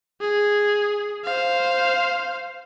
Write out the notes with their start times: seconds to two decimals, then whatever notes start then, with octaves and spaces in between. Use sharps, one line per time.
0.21 G#4
1.25 C5 F5